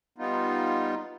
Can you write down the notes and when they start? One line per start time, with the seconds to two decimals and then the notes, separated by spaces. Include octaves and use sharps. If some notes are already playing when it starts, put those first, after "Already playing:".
0.18 G3 B3 D#4 F4